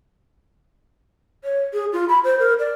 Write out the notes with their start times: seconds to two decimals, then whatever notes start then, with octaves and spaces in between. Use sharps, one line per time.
1.44 C#5
1.73 G#4
1.93 F4
2.09 B5
2.24 C5
2.39 A#4
2.60 D5